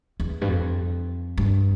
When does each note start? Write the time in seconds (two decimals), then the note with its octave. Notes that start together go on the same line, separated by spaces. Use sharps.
0.20 E2
0.41 G2
0.48 F2
1.37 G2